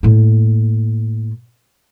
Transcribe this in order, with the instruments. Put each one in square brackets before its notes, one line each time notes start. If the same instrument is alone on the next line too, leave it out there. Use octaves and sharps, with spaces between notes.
[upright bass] A2 A#3